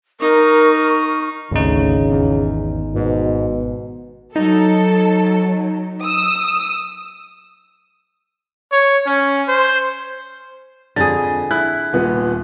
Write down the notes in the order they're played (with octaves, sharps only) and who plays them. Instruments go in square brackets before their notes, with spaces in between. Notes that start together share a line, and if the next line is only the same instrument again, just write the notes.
[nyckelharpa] D#4 [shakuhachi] A#4 [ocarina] C#6
[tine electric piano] G#1 D#4 [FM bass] D2 [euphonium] C#3
[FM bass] E2
[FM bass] G#2 [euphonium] B2
[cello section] F#3 [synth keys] D#4 [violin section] A4
[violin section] D#6 E6
[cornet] C#5
C#4
C5
[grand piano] F2 A6 [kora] D3 G#4
[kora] E4 [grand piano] F#6
[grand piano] D#1 A#2 B3